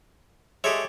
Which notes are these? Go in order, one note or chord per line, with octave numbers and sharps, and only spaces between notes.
G#3 G4 A4 C#5 E5